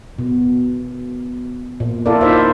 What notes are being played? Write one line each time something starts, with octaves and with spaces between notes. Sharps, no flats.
B2
A#2
E4 F4 A4 A#4 D5
D#4 C5 E5